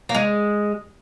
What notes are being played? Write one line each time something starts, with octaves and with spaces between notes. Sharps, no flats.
A#3
G#3